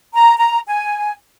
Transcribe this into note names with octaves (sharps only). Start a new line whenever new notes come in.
A#5
A#5
G#5